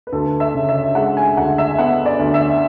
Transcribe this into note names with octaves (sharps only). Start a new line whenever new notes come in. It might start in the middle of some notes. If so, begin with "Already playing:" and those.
B4
D2 A4
E5
C#3
E5
G#3 F#5
G#5
D2 F#5
E5
B3 F#5
D5
D2
E5